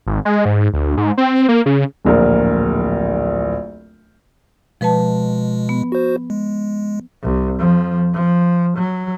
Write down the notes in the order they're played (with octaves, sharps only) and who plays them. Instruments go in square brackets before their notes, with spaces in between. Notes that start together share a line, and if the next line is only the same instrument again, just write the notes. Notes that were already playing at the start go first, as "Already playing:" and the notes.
[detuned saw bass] G#1
G#3
G#2
D2
G#2
C4
A#3
C#3
[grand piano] D1 A#1 A#4
[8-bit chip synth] B2 G#3 [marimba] F3 B4 A5
[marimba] B3
[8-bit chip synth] F#4 C5
G#3
[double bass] C2
F2 F3
F3
F#3